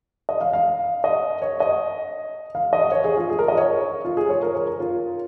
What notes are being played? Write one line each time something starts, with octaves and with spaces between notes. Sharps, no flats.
D#5
F5
F5
D#5
C#5
D#5
F5
D#5
C#5
G#4
F4
G#4
A#4
D#5
C#5
F4
G#4
C#5
A#4
C#5
A#4
F4